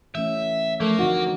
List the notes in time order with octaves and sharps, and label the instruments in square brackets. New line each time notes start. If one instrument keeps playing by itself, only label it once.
[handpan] E3 A3 C#4 [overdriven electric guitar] E5
[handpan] F3 [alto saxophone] A3 [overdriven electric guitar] A#3
[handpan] D3 C4 D#4 [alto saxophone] F#4